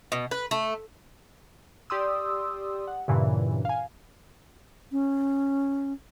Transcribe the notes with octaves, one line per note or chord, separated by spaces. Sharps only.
B2
B4
A3
G4 D5 C6 D#6 E6
F#5
G2 A#2 C#3 E3
F5 G#5
C#4